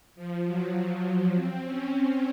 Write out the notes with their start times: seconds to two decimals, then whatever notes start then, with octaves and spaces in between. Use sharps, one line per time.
0.15 F3
0.46 F#3
1.35 C4
1.64 C#4